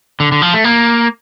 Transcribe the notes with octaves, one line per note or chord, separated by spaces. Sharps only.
D3
D3
F3
A3
A#3